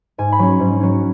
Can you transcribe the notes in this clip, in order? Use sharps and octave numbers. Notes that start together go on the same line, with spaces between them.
G#2 G#5
B5
F#3 C#4
G#2
F#3 C#4